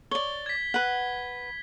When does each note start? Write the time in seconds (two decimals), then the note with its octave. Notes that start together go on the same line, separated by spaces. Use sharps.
0.11 C#5 D5 G7
0.46 G#6 B6
0.74 B4 F#5